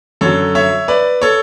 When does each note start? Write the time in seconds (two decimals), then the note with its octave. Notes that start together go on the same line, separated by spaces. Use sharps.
0.21 F#2 D3 F#3 A4 C#5
0.55 C#5 E5
0.88 B4 D5
1.22 A4 C#5